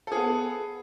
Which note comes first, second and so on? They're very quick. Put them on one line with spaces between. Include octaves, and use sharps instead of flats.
A4 G#4 B3